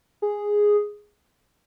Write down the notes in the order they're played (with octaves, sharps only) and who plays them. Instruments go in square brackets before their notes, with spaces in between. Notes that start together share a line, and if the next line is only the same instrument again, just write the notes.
[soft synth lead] G#4